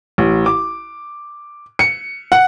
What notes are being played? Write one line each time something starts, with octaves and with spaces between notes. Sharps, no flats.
A1
D6
C#7
F#5